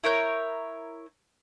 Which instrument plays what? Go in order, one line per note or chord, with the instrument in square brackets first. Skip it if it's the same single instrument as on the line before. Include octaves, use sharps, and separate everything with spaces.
[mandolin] E4 A#4 C#5 G6